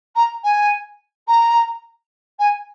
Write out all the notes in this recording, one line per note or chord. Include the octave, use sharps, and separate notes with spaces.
A#5
G#5
A#5
G#5